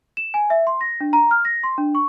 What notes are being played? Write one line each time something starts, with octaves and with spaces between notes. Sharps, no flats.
E7
G#5
E5
C6
A#6
D4
A#5
F6
A#6
C6
D4
C#6